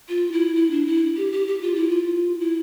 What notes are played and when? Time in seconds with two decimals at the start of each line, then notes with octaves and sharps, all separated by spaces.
0.09 F4
0.32 E4
0.55 E4
0.71 D4
0.86 E4
1.17 G4
1.32 G4
1.47 G4
1.62 F4
1.75 E4
1.89 F4
2.40 E4